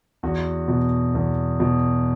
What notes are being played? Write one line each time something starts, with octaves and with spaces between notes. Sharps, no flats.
E2 F#4
B2
E2
B2